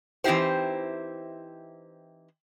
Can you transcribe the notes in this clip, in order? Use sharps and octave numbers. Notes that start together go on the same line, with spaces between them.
E3 C4 D#4 E4 G4 C5